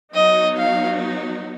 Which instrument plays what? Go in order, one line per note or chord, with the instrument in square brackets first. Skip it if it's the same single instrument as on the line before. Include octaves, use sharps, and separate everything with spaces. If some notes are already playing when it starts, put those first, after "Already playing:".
[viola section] F#3 B3 D#4 [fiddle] D#5
[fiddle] F5